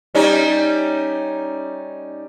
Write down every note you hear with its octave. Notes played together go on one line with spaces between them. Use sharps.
G3 C#4 D#4